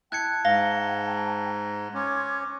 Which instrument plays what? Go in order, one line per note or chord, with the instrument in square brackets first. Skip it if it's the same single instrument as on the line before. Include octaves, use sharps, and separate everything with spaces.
[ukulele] E4 [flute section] G5 A5 [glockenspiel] F#6 G#6 C#7
[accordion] G#2 [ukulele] F5 [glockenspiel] A#6 G7
[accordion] C#4 [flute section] C6 D6 G#6